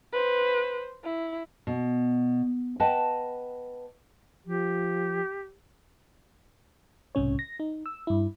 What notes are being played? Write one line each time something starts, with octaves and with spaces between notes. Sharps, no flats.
B4 C5
E4
B2
B4 D#5 F#5 G5 A5
F3 G4
B1 G#2 C3 C#4 C#5
A#6
D#4
E6
G2 E4